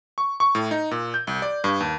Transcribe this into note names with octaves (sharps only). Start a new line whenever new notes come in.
C#6
C#6
A2
D#4
A#2
G6
C2
D5
G2
D#2